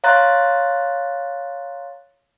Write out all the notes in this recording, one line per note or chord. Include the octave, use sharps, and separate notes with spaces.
C#5 F5 A#5 C6 F#6 A6